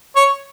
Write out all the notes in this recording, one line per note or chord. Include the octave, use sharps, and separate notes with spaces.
C#5